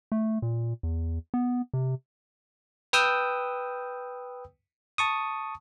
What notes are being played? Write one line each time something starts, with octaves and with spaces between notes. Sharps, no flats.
A3
A#2
E2
B3
C3
B4 G5 D#6 E6 G6
A5 C#6 D#6